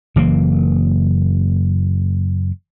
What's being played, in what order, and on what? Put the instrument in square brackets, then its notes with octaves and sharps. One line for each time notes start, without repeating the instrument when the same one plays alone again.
[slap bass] F#1 E3 A#3